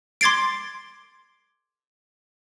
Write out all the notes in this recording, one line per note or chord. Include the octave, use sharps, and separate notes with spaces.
C6 D6 G#6 A6 C7 D7